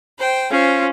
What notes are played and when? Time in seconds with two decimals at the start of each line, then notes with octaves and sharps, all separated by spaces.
0.18 C5 G5
0.50 C#4 F4 C5